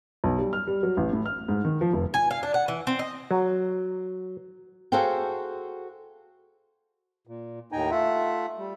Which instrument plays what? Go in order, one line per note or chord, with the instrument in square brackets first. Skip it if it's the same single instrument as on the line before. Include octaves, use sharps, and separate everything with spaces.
[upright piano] B1
G3
F6
G3
F#3
A1
A2
F6
G#2
D#3
F3
F1
[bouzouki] G#5
F5
D4
F#5
E3
C4
D#5
[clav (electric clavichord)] F#3
[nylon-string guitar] F#4 G#4 A4 C5 F5 G5
[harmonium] A#2
D#2 A2 D#4 G5 G#5 A#5
A3 F4 E5 F#5
G3